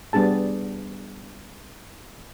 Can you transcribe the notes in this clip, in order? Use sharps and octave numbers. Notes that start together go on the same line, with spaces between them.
G3 B3 D4 G#4 A5